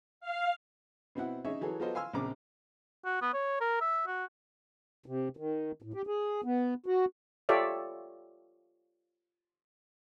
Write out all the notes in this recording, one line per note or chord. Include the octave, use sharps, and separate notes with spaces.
F5
B2 C4 E4 F#5
C#4 D#4 G#4 C#5 E5
E3 F#3 G#4 A4
F#3 B3 F4 A4 C5 D#5
F5 G#5 C6 E6 F6
A#1 C#3 C4 A#5 D6
F#4
B3
C#5
A#4
E5
F#4
C3
D#3
A2
G4
G#4
B3
F#4
F4 G4 A4 C#5 D5 E5